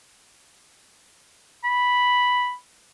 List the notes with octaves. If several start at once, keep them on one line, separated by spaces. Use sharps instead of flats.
B5